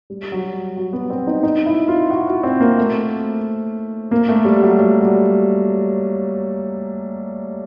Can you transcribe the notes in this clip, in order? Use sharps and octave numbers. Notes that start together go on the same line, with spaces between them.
G3
F#3
F#3
B3
C4
D#4
D#4
E4
F4
F#4
F#4
C4
A#3
A3
A#3
A3
G3
F#3
F#3
G3